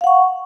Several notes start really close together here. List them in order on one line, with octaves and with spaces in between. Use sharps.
F5 F#5 C#6